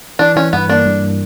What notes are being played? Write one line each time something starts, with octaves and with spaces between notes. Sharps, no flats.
E3 D4
E3 C#4
G2 B3
A#3 D4
G2